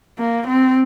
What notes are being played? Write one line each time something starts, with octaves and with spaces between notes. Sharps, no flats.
A#3
C4